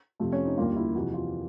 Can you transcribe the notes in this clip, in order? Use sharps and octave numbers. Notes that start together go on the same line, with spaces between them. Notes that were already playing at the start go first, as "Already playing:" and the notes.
F2 C3 F3 A3
C#4
D#4
D#2 D3 G3 A#3 F4
E4
F2 C3 E3 F#4
F4